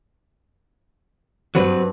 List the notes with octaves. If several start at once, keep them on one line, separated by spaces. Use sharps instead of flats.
G2 F#3 C4 B4